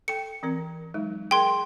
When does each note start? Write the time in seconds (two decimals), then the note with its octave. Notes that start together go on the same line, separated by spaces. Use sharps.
0.08 A4 G5 C#7
0.43 E3 C4 A#4
0.94 F#3 G#3 D#4
1.31 G#4 A#4 G5 C6